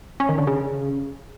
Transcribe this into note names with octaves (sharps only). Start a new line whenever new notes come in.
C#4
D#3
D3
C#3